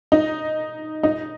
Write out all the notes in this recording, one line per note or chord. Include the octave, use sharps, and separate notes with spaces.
D#4
D#4